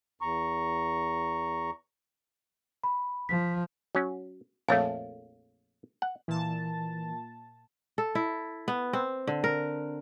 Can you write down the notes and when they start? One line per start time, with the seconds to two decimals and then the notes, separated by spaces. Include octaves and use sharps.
0.21 E2 A#5 C#6
2.84 B5
3.29 F3 B6
3.95 F#3 C#4
4.68 A#1 F2 A3 C#5 F5
6.02 F#5
6.28 A#2 E3 A5
7.98 A4
8.15 E4
8.68 B3
8.93 C4
9.27 D3
9.44 A#4